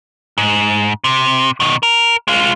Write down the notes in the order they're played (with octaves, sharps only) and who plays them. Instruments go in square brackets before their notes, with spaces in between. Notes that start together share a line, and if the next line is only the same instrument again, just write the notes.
[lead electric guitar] G#2
C3
B2 D#3
A#4
G#3 F4